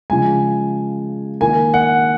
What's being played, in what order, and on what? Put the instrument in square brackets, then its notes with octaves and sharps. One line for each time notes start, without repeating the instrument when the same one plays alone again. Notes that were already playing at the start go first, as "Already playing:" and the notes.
[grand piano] C#3 F3 G#3 G#5
D#3 A#3 G#5
F#5